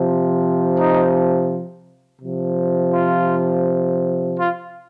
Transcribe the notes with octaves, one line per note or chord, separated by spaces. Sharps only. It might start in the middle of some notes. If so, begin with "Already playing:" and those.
Already playing: C3 F3
D#4
C3 F3
F4
F4